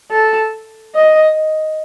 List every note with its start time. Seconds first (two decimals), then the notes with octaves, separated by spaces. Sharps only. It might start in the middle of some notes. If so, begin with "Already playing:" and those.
0.11 A4
0.95 D#5